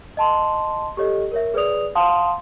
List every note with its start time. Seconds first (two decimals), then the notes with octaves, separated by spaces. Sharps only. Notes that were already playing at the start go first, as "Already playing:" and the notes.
0.17 D#5 A5 C6
0.97 G4 A4 C#5 D#5
1.32 A#4 C#5 E5
1.54 G#4 B4 C#5 D5 D#6 F7
1.95 F5 F#5 A5 C6 D#6